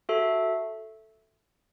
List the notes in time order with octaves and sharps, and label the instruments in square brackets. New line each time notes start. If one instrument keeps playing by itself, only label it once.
[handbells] F#4 A4 E5